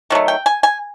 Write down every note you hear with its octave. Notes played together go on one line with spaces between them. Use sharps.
D#3 F#3 A3
G5
G#5
G#5